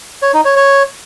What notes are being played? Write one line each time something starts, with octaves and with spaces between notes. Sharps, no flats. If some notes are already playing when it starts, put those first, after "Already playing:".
C#5
D#4
C#5
C#5